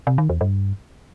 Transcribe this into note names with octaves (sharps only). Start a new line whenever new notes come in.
C3
D#3
E2
G2